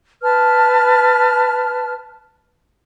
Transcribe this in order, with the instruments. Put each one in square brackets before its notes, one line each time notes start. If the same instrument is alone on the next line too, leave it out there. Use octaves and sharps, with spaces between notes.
[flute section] B4 A5 F6